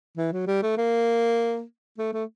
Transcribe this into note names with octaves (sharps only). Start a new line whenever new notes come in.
E3
F#3
G3
A3
A#3
A3
A3